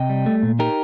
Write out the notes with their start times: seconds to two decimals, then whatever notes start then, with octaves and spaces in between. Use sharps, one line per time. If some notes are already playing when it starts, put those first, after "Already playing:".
Already playing: C3 D#5 G5
0.09 G3
0.26 A3
0.43 A#2
0.59 D#4 G4 A#4